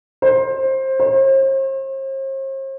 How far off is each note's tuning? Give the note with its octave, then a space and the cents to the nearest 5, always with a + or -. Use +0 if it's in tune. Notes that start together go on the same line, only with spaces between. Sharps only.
C5 +20
C5 +45